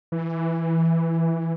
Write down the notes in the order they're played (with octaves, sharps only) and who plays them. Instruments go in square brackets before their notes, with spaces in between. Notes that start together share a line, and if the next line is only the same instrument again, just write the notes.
[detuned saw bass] E3